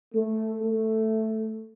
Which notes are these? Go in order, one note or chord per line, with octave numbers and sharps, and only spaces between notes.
A3
A3